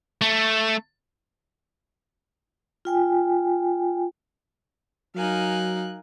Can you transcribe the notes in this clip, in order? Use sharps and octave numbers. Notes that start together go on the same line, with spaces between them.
A3
F4 G5 G#5
F#3 D#4 A#4 F5 G#5 F#6